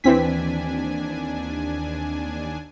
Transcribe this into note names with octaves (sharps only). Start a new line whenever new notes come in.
D#2 E3 C4 D4 G#5 B6